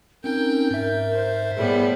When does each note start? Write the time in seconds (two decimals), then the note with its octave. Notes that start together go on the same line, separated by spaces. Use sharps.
0.24 C4 C#4 D#4 A#4 G5
0.71 G#2 A#4 E5
1.13 C5
1.57 A2 G3 B3 G#4